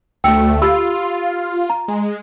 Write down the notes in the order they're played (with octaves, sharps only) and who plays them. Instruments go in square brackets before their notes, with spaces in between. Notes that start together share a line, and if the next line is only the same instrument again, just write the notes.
[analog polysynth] D2 A3 [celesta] G5 E6 C#7
[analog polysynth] F4 [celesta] G4 B5 E6
[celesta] A#5
[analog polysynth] G#3